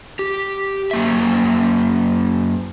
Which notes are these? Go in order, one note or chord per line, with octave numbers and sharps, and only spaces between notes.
G4
F#2 A#3 E5